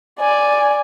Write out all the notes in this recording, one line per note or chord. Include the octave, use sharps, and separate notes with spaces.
D5 G#5